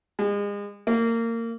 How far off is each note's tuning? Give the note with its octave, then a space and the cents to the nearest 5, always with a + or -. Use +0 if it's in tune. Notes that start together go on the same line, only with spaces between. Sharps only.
G#3 -35
A#3 -25